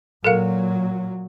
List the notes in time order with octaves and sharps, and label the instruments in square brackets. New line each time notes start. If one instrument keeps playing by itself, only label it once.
[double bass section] A#2 F#3 [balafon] A4 A#4 F5